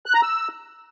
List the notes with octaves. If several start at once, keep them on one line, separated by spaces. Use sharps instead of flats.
F#6
A#5
E6